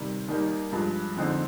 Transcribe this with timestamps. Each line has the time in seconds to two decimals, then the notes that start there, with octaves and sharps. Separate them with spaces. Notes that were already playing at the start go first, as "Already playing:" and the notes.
Already playing: C3 D#3 G3
0.28 D#2 D#3 G3 A#3 D#4
0.72 G2 F3 G#3
1.16 F2 D3 G#3 C4 D#4